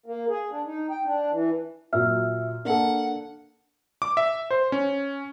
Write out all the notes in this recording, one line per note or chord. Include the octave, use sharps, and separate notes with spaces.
A#3
G#4
D4
D#4
G5
D4
E3
A#2 F#3 E5 F6
A#3 D4 A4 F#5
D6
E5
C5
C#4